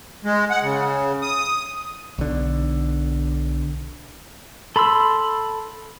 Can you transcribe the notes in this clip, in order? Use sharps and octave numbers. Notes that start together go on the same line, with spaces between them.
G#3
F#5
C#3
D#6
B1 D3
A4 B5 C6 E6